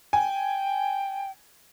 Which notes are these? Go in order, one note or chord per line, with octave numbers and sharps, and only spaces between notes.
G5 G#5